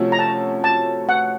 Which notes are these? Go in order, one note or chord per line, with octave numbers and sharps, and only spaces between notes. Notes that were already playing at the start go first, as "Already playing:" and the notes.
Already playing: C3 F3 A3 C#4 F#4
A#5
A5
A5
F#5